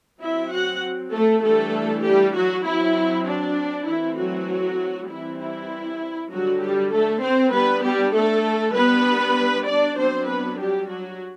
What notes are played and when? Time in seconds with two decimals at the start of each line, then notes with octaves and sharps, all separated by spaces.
0.21 F#3 C4 E4 E5
0.51 F#4 F#5
1.12 A3 A4
1.43 E3 G3 A3 D4 A4
2.04 G3 G4
2.35 F#3 F#4
2.66 F#3 C4 E4
3.27 D4
3.87 E3 A3 C4 E4
4.18 F#3 F#4
5.09 E3 G3 C4 E4
5.40 E4
6.31 D3 F#3 G3 D4 F#4
6.62 G3 G4
6.92 A3 A4
7.22 C4 C5
7.53 G3 B3 D4 B4
7.84 G3 G4
8.15 A3 A4
8.75 G3 B3 D4 B4
9.67 D4 D5
9.97 F#3 B3 C4 D4 C5
10.28 B3 B4
10.58 G3 G4
10.89 F#3 F#4